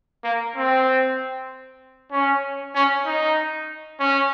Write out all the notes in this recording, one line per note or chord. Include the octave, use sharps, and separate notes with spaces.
A#3
C4
C#4
C#4
D#4
C#4